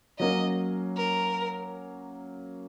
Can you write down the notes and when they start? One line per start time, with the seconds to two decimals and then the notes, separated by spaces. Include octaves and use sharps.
0.19 F#3 A#3 C#4 D#5
0.97 A#4